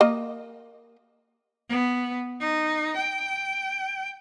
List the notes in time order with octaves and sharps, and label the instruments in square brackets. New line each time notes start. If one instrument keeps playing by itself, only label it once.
[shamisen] A#3 D#5
[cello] B3
D#4
G5